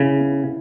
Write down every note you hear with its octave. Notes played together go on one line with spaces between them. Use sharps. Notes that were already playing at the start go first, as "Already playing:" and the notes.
Already playing: C#3 E4
B3